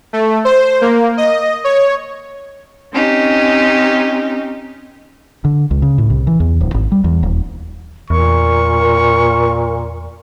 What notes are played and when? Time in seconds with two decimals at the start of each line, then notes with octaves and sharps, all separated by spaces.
0.13 A3
0.45 C5
0.81 A#3
1.17 D#5
1.64 C#5
2.93 C4 C#4 D#4 G4
5.45 D3
5.71 C#2
5.82 C#3
5.98 A2
6.10 C2
6.27 E3
6.40 E2
6.61 D1
6.74 G#1
6.92 G3
7.04 E2
7.23 D#1
8.10 E2 A#2 A#4 C#6